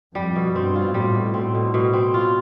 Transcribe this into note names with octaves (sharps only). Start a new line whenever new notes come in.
F2 G3
B2
G2 C4
F4
A2 G3
B2
A2 C4
B2
B2
C4
F4